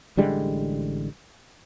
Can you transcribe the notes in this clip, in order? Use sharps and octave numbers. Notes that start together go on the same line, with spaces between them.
A1 D3 G3 G#3